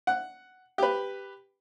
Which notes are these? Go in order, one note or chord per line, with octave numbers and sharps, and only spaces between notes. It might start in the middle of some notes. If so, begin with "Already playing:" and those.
F#5
G4 B4